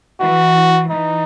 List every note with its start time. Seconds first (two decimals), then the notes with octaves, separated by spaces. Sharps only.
0.20 E3 F#4
0.90 E3 D#4